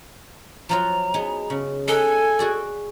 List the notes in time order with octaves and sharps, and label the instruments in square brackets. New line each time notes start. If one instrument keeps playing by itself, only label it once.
[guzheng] F3 F#3 F4 [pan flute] A#5
[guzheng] B3 D#4 G#4
C#3
[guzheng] D#4 F#5 [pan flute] A4 [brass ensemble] G#5
[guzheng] F#4 G#4 D5